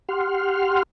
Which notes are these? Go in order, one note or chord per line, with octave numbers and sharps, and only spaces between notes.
G4 F#5 C6 F6